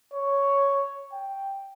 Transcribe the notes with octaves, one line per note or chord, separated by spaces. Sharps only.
C#5
G5